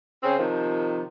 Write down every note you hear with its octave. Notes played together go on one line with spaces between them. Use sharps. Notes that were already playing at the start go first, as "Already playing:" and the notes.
C#3 C4
C3 D#3 F3